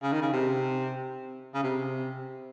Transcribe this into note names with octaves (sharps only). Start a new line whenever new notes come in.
C#3
D#3
C#3
C3
C#3
C3